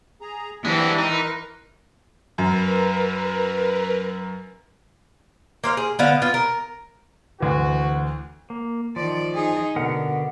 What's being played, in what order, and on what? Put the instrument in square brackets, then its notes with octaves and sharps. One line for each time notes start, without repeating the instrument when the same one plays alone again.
[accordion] G#4 A#5
[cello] E3 [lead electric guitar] G#3 C4 [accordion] D4 E4 G4
[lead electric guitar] D#4 [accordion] A#4 B4 C6
[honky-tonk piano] F#2 [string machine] A#4 B4
[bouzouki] A#3 C5 F5
G#4
D3 B3 F5
B3 F4 F5
A#4
[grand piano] D2 E3 [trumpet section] F#4
[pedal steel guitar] A#3
[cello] D#3 D5 [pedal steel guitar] F3
[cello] D#4 G#4
[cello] B2 [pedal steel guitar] D3 A#4 F#5